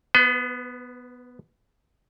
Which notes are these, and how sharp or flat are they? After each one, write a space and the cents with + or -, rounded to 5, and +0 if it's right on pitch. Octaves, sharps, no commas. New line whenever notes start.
B3 +0 B4 +45